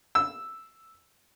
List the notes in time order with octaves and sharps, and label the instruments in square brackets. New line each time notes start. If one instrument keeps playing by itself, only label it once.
[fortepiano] E6